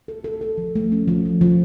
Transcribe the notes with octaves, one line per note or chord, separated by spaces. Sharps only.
A4
A4
A4
F3
A3
C#4
F3
F3
F3